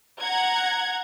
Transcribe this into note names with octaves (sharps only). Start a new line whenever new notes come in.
F#5 A#5 G#6